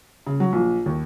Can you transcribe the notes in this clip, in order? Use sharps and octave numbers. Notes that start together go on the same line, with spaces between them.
C#3
F#3
A#1
D#2